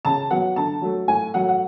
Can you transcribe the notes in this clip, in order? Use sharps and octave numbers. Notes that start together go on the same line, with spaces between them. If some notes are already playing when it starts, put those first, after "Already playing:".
C#3 A5
F#3 B3 F#5
D3 A5
F#3 A3
A2 G#5
F#3 A3 F#5
F#5